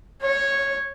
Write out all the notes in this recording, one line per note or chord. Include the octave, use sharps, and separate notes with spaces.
C#5